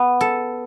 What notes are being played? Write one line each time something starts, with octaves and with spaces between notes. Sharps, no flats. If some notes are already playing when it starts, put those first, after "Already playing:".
Already playing: B3
A4